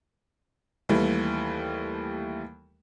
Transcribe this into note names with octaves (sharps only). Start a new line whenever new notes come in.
D#2 E3 G3 A3